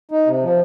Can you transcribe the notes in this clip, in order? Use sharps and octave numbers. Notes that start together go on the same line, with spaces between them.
D#4
C3
F3